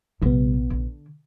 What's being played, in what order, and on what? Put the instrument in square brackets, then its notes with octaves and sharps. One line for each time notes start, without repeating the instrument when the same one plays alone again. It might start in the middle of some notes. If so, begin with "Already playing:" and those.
[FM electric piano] A#1 B3 [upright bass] C3 G3
[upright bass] D3